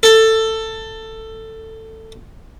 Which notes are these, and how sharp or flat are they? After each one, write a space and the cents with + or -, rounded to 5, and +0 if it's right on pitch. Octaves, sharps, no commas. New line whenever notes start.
A4 +15